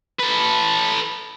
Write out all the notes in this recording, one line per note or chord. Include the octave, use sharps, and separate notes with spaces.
A4 B4